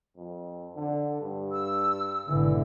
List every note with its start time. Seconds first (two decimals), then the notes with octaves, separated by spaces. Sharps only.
0.17 F2
0.76 D3
1.21 G2
1.52 E6
2.29 G#1 B2 D3 E3